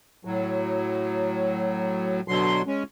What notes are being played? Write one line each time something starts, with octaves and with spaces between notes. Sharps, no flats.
A2 F#3
B2 D3 F#3 C6
G#3 C#4